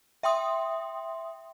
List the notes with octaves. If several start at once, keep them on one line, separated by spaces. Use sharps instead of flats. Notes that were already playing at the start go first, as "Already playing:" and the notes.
E5 G5 C6 D#6